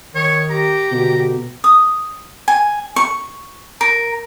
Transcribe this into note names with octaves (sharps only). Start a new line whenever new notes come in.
D#3 C#5
G4 A#5
B2 D3
D#6
G#5
C#6
A#4